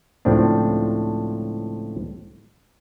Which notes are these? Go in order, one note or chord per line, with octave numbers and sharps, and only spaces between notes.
C#2 A2 F3 C4 D4